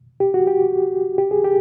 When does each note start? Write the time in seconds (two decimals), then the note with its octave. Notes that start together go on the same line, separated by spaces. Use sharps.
0.20 G4
0.34 F#4
0.47 G4
1.18 G4
1.31 G#4
1.44 G4